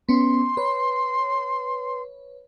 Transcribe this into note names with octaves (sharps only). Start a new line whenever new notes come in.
B3 C#4 C6
B4 C#5